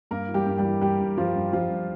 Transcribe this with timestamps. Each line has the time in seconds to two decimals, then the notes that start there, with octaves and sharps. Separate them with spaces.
0.11 G2 A#3 A#4
0.29 E3
0.34 G3 G4
0.46 G2
0.58 G3 G4
0.65 E3
0.81 E3 G3 G4
1.00 G2
1.17 G2 F3 F4
1.35 G2
1.53 G2 F3 F4
1.70 G2